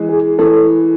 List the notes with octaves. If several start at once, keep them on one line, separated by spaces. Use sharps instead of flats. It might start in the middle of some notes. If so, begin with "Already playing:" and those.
Already playing: E3 G#3
G#4
E3 A4